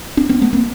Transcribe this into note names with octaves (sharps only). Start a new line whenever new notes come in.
C4 D4
B3 C#4
A3 B3
A#3 C4